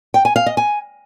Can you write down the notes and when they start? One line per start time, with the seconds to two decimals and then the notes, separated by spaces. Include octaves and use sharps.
0.14 G5
0.25 G#5
0.36 F5
0.46 D#5
0.57 G#5